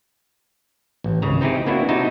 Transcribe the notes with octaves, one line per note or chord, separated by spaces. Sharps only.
A1
G#1 C#2 C#3 A#5
C4 D#4 E4 G4 G#4
A#3 B3 C#4 D4 E4 F#4
C3 D#4 E4 F#4 A5